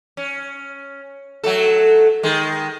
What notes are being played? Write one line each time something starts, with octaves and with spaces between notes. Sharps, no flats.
C#4
F#3 A3 A4
D#3 G#3